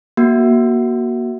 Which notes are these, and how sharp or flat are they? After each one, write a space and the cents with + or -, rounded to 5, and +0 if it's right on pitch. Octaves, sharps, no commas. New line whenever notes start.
A#3 +25 F#4 +10